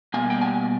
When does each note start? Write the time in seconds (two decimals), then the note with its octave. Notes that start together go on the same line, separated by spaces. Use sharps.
0.14 B2 G3 A#3 G#5
0.30 G5
0.41 G#5